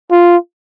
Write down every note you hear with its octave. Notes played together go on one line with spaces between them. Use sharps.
F4